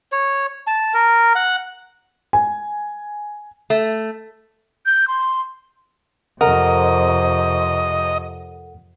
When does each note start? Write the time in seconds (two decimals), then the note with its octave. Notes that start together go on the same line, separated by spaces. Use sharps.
0.12 C#5
0.67 A5
0.94 A#4
1.35 F#5
2.33 G#5
3.70 A3
4.86 G6
5.08 C6
6.41 F2 C3 A4 A#4 D#5 F#5